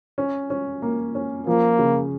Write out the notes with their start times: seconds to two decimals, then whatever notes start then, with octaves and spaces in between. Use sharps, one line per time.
0.18 C#4
0.50 C#4
0.82 A#3
1.15 C#4
1.47 F3 A#3
1.79 C#3